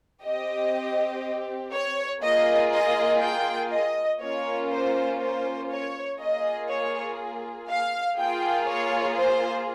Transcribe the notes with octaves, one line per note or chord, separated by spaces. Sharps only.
C4 G4 D#5
C#5
A#3 F4 G#4 D#5
D#5
G5
D#5
A#3 C#4 F4 C#5
C5
C5
C#5
A#3 F4 G#4 D#5
C#5
F5
A#3 F4 G#4 G5
C#5
C5